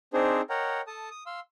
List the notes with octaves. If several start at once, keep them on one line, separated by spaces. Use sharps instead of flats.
C4 D4 D#4 G#4 C5
A#4 C#5 D#5 F#5 G5 A#5
A4 A5 D#6
D#6
F5 C6 E6